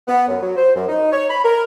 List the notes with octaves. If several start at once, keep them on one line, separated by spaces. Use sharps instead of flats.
B3
F#2
F#3
C5
F#2
D#4
C#5
B5
A#4